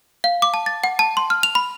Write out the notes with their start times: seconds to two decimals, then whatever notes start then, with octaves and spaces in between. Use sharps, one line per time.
0.24 F5
0.42 D6
0.54 A5
0.66 A6
0.84 F#5
0.99 A5
1.17 C6
1.30 F6
1.43 F7
1.55 B5